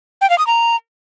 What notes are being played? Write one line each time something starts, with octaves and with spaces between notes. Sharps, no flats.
G5
F5
D#6
A#5